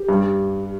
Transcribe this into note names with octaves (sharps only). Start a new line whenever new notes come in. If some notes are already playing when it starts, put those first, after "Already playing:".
Already playing: G4
G2